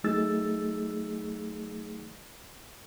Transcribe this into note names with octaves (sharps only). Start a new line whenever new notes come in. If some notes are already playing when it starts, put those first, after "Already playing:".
F#3 A3 D#4 G#4 E6 A6